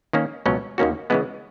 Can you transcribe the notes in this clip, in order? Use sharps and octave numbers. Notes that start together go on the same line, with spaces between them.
D#3 A#3 C#4
C#2 B2 F#3 C#4
D#2 D#3 A#3 C#4 F#4
C#3 E3 G#3 B3